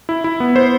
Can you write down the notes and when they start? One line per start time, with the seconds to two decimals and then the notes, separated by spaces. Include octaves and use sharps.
0.09 E4
0.24 E4
0.40 B3
0.56 C5